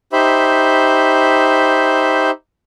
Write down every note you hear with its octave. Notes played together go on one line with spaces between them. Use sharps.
D#4 G4 C5 E5 B5